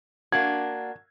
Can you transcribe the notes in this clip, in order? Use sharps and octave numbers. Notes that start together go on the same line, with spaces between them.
A#3 D4 F#4 G#6